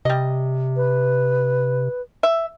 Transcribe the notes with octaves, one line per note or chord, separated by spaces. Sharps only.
C3 G3 D#5
B4
E5